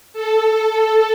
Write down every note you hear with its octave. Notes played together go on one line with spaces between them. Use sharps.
A4